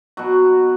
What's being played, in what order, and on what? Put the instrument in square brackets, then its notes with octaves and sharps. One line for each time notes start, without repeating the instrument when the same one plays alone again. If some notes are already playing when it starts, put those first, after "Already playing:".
[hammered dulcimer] B2 F#3 F#4